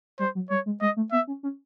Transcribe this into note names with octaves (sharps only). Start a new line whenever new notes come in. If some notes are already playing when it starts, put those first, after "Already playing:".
G3 C5
F#3
G3 C#5
G#3
G#3 D#5
A3
B3 E5
C#4
C#4